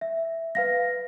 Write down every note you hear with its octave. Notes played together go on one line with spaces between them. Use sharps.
E5
B4 F5 A#6